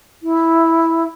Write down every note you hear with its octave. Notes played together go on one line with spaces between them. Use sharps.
E4